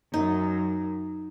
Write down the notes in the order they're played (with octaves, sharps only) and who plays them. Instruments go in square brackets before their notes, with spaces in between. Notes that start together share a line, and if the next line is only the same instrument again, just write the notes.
[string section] F#2 [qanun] D#4